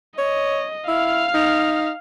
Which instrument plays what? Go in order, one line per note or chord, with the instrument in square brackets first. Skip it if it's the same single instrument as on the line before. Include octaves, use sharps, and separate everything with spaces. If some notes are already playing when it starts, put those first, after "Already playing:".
[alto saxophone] C#5 [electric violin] D#5
[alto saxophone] E4 [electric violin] F5 F6
[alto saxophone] D#4